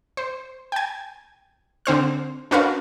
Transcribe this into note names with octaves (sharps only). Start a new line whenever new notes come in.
C5
G5 G#5
D3 C4 C5 F6
C#4 D4 F#4 A#4 B4 F5